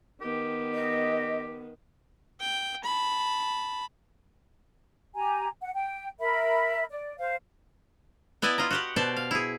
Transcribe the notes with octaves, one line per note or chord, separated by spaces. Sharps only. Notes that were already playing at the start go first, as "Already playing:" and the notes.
D#3 B3 G4
D#5
G5
A5 B5
G4 G#5 A#5
F#5
G5
A#4 E5 B5
D5
C5 F5
B3 E4 D5 D#5 G#5 A5
F4 D#5 A#5
F#4 G4 F#5
B2 C5 D5 A5
F5
E4 G#4